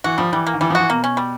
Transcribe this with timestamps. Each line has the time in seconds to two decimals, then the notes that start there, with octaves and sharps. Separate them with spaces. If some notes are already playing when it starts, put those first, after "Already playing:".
0.04 E3 F#4
0.18 F3 G3
0.32 E3 G3
0.47 A#3
0.54 D#3
0.61 E3 G3
0.70 F3
0.75 E3 F#4
0.89 B2 A#3
1.04 C#4
1.17 G3